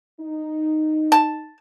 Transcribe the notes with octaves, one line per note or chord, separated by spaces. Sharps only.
D#4
A5